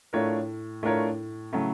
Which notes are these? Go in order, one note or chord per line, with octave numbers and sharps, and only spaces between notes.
A2 A3 D4 F4 A#4 C#5
A2 A3 D4 F4 A#4 C#5
A2 C#3 F#3 A3